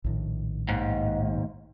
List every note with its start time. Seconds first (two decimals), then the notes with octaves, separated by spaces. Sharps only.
0.04 A#1 A2 D#3
0.69 D#2 G#2